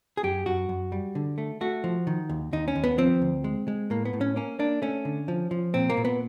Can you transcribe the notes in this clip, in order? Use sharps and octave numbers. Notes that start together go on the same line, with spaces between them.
G#4
F#2 G4
F#2 F#4
F#2
G3
D3
A3
A3 F#4
F3
D#3
D#2
D#2 D#4
C#4
D#2
B3
F3 C4
D2
G#3
G#3
A2 A#3
B3
A2
C#4
A#3 C#4
A#3 D4
A3 C#4
D3
F3
F3
A#2 C4
A#3
A#2
B3